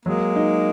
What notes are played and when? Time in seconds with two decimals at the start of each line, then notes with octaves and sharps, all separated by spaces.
0.06 F#3 G#3 A#3
0.36 D#4